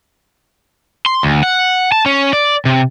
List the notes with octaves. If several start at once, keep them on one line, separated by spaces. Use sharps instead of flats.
C6
D2
F#5
A5
C#4
D5
C3